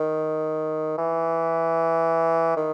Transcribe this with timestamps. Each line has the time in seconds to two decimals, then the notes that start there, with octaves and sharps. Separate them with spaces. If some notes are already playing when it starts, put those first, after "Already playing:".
Already playing: D#3
0.98 E3
2.56 D#3